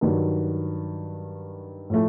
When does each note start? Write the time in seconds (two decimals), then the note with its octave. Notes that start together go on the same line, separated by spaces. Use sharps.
0.01 G2 D#3 F#3
1.90 A2 F3 A3